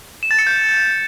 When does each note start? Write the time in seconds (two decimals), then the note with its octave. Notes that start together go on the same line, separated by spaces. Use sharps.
0.23 E7
0.31 A6
0.39 C#7
0.47 G6